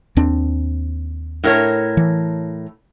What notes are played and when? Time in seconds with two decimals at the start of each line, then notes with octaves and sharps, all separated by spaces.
0.16 D#2 C4 D4
1.44 A2 A#4 C#5
1.97 E3